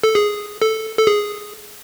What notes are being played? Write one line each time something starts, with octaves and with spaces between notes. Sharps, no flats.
A4
G#4
A4
A4
G#4